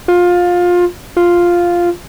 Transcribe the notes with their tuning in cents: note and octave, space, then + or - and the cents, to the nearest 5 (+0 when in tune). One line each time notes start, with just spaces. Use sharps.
F4 +20
F4 +0